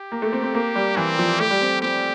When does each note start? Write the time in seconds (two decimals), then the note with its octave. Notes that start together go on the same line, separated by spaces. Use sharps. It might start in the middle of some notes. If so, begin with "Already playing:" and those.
Already playing: G4
0.12 A#3
0.22 A3
0.32 C4
0.43 C4
0.55 A#3
0.76 G3
0.97 E3 C4
1.19 F3
1.40 A3 G4
1.51 G3
1.61 C4
1.82 C4 G4